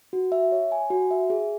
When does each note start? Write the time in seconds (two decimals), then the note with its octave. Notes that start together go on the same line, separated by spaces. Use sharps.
0.13 F#4
0.32 E5
0.52 C#5
0.72 G#5
0.90 F#4
1.11 E5
1.30 G#4